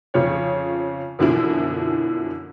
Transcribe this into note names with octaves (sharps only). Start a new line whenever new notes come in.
F2 C#3 F3 C#5
F#2 B2 D3 E3 F3 E4